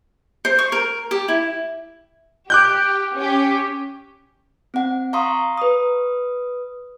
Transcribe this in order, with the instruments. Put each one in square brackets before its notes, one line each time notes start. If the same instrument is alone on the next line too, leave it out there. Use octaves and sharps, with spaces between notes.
[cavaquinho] C5
C#6
A#4
G4
E4
[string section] G4 [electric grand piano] D6 F#6 G6
[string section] C#4 G4
[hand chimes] C4 F#5
F5 A#5 C6 C#6 D#6
B4 D#6